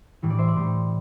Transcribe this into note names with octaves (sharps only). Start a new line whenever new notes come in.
A2 E3 G3
D5
C5 E5
D5
A2 G3 C5